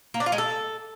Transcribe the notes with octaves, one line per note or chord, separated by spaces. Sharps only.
A#3
D4
F4
G#3
A4